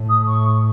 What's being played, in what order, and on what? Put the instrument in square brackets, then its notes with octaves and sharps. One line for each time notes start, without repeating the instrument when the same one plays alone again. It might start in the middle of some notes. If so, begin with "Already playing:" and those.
Already playing: [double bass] A2
[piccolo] D#6
C#6